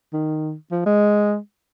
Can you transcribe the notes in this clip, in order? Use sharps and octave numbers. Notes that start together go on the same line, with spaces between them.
D#3
F3
G#3